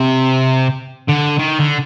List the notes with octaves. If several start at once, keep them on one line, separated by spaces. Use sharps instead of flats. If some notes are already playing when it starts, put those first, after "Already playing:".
Already playing: C3
D3
D#3
D3